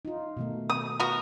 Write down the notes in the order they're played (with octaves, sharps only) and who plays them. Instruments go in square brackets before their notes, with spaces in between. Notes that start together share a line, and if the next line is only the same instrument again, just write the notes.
[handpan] D#4 F4
B2 D#3 A3
[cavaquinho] D#6
[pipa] B3 F#4 A#4